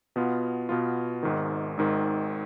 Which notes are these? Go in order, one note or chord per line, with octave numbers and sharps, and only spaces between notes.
B2 B3 F4
B2 B3 F4
G#1 G#2 D#3
G#1 G#2 D#3